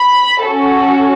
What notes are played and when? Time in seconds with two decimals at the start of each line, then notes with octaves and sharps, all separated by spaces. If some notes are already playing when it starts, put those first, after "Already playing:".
Already playing: B5
0.45 C#4 F#4 A4